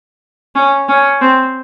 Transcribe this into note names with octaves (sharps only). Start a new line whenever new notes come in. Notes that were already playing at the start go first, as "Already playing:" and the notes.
C#4
C#4
C4